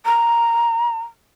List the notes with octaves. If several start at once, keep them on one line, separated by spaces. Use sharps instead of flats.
A#5